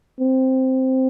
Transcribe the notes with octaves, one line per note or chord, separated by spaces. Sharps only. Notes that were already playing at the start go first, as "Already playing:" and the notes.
C4